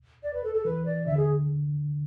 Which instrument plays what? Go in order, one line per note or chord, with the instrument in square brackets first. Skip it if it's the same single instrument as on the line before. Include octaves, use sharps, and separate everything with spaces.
[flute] D5
B4
A4
A4
[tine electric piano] E3 [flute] B4
[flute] D5
[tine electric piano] D3 [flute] E5
[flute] G#4